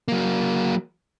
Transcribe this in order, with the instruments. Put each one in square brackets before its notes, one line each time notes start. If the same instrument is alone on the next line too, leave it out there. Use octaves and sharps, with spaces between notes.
[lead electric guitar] F#3 A#3